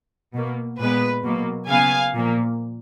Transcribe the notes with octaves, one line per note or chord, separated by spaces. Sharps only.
B2 A#3
A#2 G#3 B3 B4
B2 F#3 A#3
C#3 F#3 B3 F5 G#5
A#2 F3 A#3